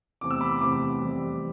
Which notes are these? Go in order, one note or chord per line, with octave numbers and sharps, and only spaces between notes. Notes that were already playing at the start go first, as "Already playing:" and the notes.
E2 C3 E3 A3 C4 D6
E6
B5 D6
E2 C3 E3 A3 C4 B5 D6
F2 E3 G3 C4